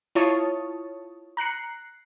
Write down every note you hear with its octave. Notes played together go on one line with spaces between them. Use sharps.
E4 F4 C#5 A5 C#6 D#6
A#5 F#6 C7 C#7